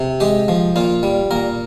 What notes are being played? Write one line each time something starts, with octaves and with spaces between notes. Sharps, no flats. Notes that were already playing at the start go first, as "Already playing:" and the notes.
Already playing: C3
G#3 G4
F3
A#2 F4
G3
A#2 A#4